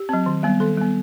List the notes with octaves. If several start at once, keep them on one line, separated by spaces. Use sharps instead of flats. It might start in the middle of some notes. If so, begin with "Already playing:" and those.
Already playing: G4
F#3 C4
D#3
G3 B3
D#3 A4
G3 B3